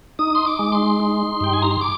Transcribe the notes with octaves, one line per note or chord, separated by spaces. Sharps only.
D#4 D#6
C6
D6
G#3
C6
D#4
G2 G5
G#5
A#5
C6
D6